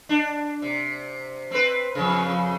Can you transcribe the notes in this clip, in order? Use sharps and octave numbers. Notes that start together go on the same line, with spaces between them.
D4
C3
C4 B4
F2 C#3